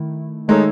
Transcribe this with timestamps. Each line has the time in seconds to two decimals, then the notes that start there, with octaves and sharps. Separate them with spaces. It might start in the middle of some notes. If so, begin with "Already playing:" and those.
Already playing: D#3 A3 E4
0.48 D#3 G#3 A3 D#4 A4 C#5